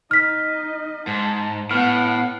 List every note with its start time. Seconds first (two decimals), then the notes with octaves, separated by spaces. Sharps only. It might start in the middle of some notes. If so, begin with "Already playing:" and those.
0.11 D#4 D#5 F6 B6
1.07 G#2 A5
1.71 A2 B3 F#5 F6